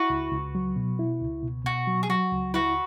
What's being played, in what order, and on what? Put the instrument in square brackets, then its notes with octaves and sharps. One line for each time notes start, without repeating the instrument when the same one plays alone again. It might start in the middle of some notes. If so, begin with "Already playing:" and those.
Already playing: [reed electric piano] E4 [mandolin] F#4 B4
[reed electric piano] C#2
C#2
F#3
B2
E4
C#2
B2
[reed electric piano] B2 [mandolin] F#4
[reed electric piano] F#3
[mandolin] G#4
[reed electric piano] F#3 [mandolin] F#4
[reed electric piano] C#2
[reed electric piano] E4 [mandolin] F#4 B4